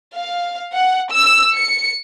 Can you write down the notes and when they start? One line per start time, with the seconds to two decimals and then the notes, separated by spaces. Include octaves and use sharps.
0.16 F5
0.74 F#5
1.12 E6
1.55 C#7